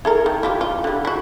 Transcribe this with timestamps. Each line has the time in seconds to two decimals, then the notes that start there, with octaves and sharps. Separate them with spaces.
0.05 E4 A4 A#4
0.26 D#3
0.43 E4 F4 G4
0.61 F4
0.84 D3 G3
1.05 E4 F#4